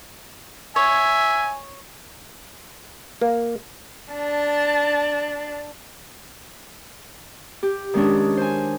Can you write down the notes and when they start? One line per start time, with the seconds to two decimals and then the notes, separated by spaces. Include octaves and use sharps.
0.76 C#5 E5 G#5
3.21 A#3
4.13 D4 A5
7.63 G4
7.94 D#3 G#3 C#4 D4
8.37 C5 G#5